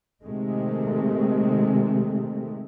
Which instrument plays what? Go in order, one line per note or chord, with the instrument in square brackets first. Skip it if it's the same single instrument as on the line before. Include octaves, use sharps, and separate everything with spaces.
[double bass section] C3 D#3 G#3 A3